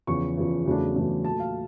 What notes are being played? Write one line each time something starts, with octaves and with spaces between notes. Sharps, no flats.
E2 C#3 F3 C#6
E2 C#3 F3
E2 C#3 F#3 A3 D4
E2 C#3 F#3 A3 D4
A#2 F#3 A3 A5
F5